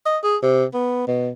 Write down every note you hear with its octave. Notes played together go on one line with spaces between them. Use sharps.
D#5
G#4
C3
B3
B2